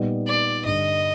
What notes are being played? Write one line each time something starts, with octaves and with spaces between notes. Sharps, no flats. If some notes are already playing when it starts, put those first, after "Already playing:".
Already playing: A#2 G3 B3 D#4
D5
G2 D3 G3 D#5